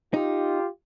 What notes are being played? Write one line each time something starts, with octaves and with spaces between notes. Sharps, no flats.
D#4 F4 G4